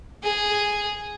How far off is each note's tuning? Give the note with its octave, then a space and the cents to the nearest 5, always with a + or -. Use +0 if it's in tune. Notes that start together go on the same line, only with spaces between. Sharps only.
G#4 -5